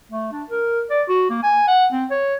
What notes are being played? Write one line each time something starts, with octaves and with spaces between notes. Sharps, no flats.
A3
D4
A#4
D5
F#4
A#3
G#5
F#5
C4
C#5